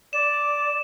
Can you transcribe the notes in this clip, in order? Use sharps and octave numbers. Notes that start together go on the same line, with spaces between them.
D5 E7